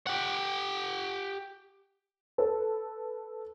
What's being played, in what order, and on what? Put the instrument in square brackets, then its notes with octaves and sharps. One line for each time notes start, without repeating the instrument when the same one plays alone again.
[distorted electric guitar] G4 F#5
[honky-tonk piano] A4 B4